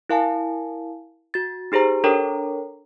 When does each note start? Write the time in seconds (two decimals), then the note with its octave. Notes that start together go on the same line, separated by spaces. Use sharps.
0.09 E4 A#4 F5 G#5 A5
1.34 F#4 A6
1.72 D#4 G4 G#4 C5 A#5
2.04 D4 A4 A#4 C#5 G5 A#5